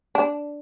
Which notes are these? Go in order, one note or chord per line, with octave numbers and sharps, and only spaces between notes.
D4